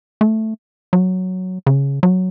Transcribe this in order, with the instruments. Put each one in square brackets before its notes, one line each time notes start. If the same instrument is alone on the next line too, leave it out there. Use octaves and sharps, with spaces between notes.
[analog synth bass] A3
F#3
C#3
F#3